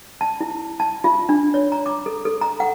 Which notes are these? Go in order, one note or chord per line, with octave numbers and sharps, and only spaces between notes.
A5
E4
A5
F4
D4
C#5
A#5
D6
A4
A4
A#5
F#5